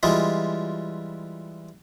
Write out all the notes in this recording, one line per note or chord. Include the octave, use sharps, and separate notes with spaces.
E3 G3 G#3 F4